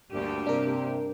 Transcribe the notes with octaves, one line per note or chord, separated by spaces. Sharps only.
D2 G2 A#3 G4
C3 D4 A#4